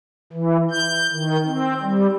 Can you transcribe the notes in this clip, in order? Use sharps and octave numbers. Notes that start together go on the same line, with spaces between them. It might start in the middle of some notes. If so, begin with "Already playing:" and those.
E3
G6
D#3
C4
G3